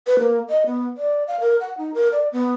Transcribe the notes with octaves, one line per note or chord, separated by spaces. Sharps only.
B4
A#3
D#5
B3
D5
F5
A#4
F#5
D#4
A#4
D5
B3